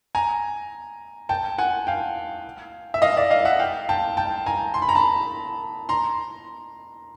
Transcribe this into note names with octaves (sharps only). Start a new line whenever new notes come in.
G#5 A#5
G5 A5
F#5 G#5
F5 G5
E5
D#5 F5
D5 E5
D#5 F5
E5 F#5
F5 G5
G5 A5
G5 A5
G#5 A#5
C6
B5
A#5
A5 B5
A#5 C6